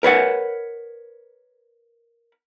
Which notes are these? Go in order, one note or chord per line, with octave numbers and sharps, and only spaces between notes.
A#4 B4 C#5 F#5